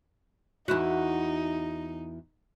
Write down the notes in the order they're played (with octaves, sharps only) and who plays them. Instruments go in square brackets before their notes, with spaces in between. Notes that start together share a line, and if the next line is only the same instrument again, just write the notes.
[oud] E2 E4 F#4 [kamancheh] D#4